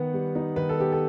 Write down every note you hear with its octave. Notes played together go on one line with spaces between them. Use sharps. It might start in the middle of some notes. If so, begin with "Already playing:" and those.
Already playing: D#3 B3 F#5
G3
D#4
D#3 B4
A4
B3 G4
A4